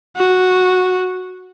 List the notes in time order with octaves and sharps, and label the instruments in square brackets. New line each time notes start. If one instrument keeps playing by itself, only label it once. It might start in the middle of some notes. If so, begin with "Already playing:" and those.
[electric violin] F#4